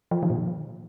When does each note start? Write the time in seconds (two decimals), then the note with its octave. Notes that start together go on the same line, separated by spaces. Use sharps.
0.11 F3
0.23 D#3
0.30 A#2